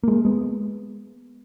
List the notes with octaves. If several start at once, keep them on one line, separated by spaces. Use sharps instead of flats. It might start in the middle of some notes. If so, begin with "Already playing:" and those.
G#3 A#3
G#3 B3